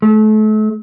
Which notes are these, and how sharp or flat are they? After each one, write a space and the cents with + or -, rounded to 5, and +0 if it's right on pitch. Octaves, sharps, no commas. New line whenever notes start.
A3 -35